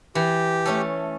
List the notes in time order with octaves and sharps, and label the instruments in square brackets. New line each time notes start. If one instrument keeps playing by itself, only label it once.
[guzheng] E3 [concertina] G4
[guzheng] A3 C#4 A4